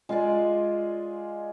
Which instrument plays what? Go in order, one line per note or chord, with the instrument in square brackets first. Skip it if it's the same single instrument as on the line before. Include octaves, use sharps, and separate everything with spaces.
[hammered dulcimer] G#3 F4 G#4 D5